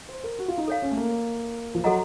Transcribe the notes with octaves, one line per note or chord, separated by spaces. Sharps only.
C5
A#4
F#4
F4
D#4
A4 C#5 F5
C#4
A3
A#3
F3
F#3 F#4 A4 D#5 F#5 A#5